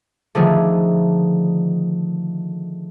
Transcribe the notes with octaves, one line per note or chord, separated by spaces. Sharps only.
D3 D#3 F3 A3 D4 G#4